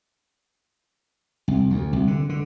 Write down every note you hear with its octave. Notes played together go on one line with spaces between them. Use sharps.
C2
D2
C2
D3
D3